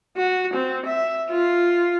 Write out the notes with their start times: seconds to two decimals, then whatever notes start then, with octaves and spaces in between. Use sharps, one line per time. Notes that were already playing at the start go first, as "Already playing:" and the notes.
0.17 F#4
0.54 C4
0.87 E5
1.30 F4